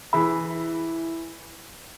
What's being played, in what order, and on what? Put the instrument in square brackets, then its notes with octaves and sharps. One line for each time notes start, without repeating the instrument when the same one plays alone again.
[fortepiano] E3 G#4 E5 [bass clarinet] E4 [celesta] B5